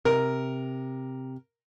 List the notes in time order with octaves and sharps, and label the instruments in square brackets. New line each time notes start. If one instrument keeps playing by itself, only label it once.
[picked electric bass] C3 [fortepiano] A#4